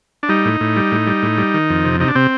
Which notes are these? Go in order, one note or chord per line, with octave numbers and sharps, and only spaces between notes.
D4
G3 D#4
A2
A2
G3
A2
G3
A2
G3
D#3
F2
C3
C3 D#4
D4
C3 C4